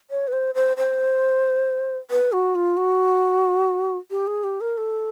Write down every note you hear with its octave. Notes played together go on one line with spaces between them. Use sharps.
C#5
B4
C5
C5
C5
B4
F#4
F4
F#4
G4
G#4
G4
A#4
A4